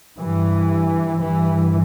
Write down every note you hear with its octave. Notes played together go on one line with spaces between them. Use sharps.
G2 E3
G2 E3